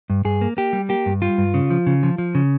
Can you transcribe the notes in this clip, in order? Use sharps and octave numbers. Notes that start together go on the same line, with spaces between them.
G2
G2 G#4
A#3
A#3 G4
G3
A#3 G4
G2
G3 F4
G2
C#3
F3
C#3
F3
F3
C#3